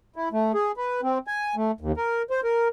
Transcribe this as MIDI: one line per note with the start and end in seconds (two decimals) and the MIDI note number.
0.16 0.29 64
0.32 0.52 57
0.54 0.72 68
0.77 1.01 71
1.03 1.18 60
1.27 1.55 80
1.56 1.71 57
1.81 1.92 39
1.97 2.22 70
2.30 2.41 72
2.44 2.68 70